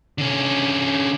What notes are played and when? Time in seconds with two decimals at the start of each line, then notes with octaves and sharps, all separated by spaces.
0.18 D3 C#4